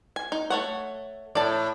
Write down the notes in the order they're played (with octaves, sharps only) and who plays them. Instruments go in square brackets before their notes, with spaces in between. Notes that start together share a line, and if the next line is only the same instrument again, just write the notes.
[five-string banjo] G#5
D#4
A3 C#5 F#5
[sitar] A2 [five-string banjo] D5 A5